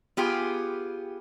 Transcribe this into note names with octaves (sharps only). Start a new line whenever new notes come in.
B3 F4 G4 G#4